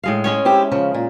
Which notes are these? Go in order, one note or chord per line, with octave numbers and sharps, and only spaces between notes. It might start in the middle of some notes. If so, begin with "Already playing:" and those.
A2 G#3 F5
G#3 C#4 C#5
C4 E4 G4
C#3 F3
A#2